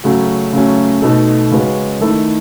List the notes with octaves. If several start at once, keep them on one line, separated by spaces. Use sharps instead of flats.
C#3 F#3 A3 C#4 F#4
C#3 F#3 A3 C#4
B2 A3 D#4 A4
C#3 G#3 C#4 F#4 B4
D#3 A3 E4 A4